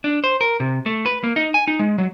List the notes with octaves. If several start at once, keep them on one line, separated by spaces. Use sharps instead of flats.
D4
C5
A#4
C3
A3
B4
A#3
D#4
G#5
D#4
G#3
F#3